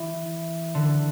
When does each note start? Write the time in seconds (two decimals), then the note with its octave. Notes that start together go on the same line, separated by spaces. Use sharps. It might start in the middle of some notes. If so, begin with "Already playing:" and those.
Already playing: E3
0.75 D3